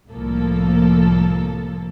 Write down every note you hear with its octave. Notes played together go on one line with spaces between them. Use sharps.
C2 A2 F3 A#3 A4